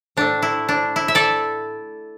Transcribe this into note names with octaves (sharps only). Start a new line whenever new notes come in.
A2 A3 D4
E4
D4
E4
E5
A4 D5